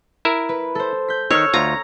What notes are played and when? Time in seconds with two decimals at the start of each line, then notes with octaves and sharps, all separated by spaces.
0.25 E4 A#4 E5
0.49 B4
0.75 A4 C5
1.08 G6 B6
1.31 D#3 C#5 E6 F6
1.54 D2 F4 A#5